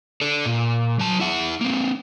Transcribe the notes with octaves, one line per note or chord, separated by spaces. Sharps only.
A4 D5
A#2
F#3 A5
E4 F#5
A#3 C4